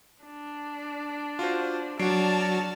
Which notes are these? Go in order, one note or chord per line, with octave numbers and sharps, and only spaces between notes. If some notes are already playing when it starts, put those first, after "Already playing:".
D4
F4 F#4 C5
F#3 D4 F#4 D5 A5 F6 C7 D7